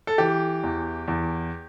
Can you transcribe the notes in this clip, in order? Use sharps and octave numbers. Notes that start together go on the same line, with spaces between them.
A4
E3 G4
E2
E2